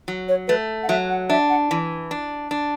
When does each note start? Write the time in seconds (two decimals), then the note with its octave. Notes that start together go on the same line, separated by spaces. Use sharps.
0.08 F#3
0.28 C#5
0.48 A3 B4
0.83 F#5
0.89 F#3 E5
1.10 F#5
1.29 D4 E5
1.50 F#5
1.71 E3
2.11 D4
2.51 D4